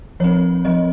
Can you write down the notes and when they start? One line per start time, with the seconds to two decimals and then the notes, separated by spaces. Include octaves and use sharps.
0.20 F3 C4 C#5
0.65 F3 C4 D#5